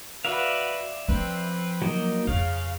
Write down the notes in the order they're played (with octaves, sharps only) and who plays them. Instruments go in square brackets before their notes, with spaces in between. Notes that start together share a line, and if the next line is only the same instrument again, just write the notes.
[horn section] F#4 B4 [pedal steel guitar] D5 E5 F5
[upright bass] F3 [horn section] C4 B4
[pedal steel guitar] F#3 A#3 D#4
[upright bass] F2 [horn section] C#3 [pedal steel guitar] F5